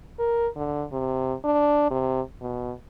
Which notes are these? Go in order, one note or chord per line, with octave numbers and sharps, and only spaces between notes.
A#4
D3
C3
D4
C3
B2